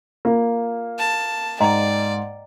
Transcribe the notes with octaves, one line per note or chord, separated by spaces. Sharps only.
A#3 F4
A5
G#2 D5 D#5 G5 A#5